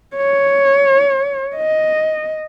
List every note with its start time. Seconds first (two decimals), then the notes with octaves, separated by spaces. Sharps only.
0.16 C#5
1.56 D#5